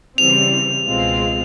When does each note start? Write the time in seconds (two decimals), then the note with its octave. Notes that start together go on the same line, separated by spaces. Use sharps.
0.18 C#3 E3 G3 C4 F7
0.86 C#2 B2 G#3 C4 F4